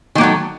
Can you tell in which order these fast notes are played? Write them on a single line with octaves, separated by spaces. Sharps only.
D#3 A#3 F#3 A3